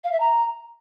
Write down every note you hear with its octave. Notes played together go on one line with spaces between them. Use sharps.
F5
E5
A#5